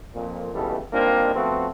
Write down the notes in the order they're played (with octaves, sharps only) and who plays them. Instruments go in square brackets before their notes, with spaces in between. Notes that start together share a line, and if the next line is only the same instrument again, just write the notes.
[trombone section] F2 A#2
C#2 B2 E3 G3 A3
G3 A#3 C4 D4 D#4 F4
F3 A3 B3 C4 F4 F#4